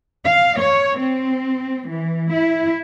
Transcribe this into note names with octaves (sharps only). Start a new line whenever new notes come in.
F5
C#5
C4
E3
E4